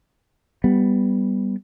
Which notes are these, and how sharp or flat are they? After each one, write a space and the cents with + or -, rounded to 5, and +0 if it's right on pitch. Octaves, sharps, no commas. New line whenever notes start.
G3 +0 B3 +0